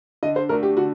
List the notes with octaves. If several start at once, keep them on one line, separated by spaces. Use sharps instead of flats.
D3 D#5
C5
A3 D4 F#4 A#4
G4
D3 F#4